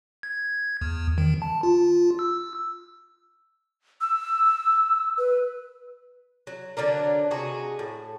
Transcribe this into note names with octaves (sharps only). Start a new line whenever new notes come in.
G#6
E2
D#3
A5
F4
E6
E6
B4
F#3
D3 F#3 D4 A#4
C3 D#4 F#4 G#4
A2